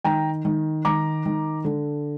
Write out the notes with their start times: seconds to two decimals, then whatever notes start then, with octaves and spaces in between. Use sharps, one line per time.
0.04 D#3 G5 A#5
0.45 D#3
0.85 D#3 A#5 D6
1.26 D#3
1.65 D3